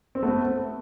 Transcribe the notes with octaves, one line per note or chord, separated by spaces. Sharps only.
C4
A3 B3